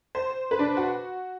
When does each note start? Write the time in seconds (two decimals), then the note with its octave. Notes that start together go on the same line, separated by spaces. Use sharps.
0.15 C5
0.51 B4
0.59 D4
0.77 F#4